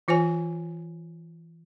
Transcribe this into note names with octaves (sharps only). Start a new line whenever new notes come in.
E3 F4 C5 C#5 G#5